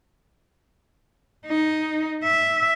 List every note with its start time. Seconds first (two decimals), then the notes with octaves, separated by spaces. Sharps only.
1.46 D#4
2.24 E5